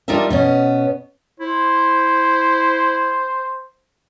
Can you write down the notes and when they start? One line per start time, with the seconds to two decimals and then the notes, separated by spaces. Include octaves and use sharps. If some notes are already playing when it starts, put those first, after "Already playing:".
0.08 G3 D4 D#4 F4 A#4 E5
0.30 B2 B3 C#4
1.40 E4 C5